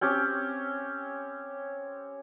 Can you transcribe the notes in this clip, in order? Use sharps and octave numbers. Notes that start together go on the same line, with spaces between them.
C4 C#4 G4